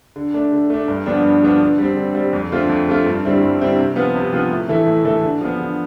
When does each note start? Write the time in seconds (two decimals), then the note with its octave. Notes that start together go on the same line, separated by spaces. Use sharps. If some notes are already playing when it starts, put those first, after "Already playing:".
0.16 D3
0.34 A3 D4
0.52 D3
0.70 A3 D4
0.88 G2
1.06 D3 F3 B3 D4
1.24 G2
1.43 D3 F3 B3 D4
1.61 D3
1.78 G3 C4
1.96 D3
2.15 G3 C4
2.33 F2
2.51 D3 A3 C4 F4
2.69 F2
2.87 D3 A3 C4 F4
3.06 G2
3.24 D3 G3 C4 E4
3.41 G2
3.59 D3 G3 C4 E4
3.78 C3
3.96 F3 B3 F4 B4
4.15 C3
4.33 F3 B3 F4 B4
4.50 A2
4.68 E3 A3 E4 A4
4.87 A2
5.05 E3 A3 E4 A4
5.23 D3
5.41 F3 B3
5.60 D3